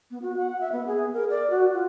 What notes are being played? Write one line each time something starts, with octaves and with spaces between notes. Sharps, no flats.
B3
F#4
F#5
E5
B3
G#4
A#4
D5
F#4
F4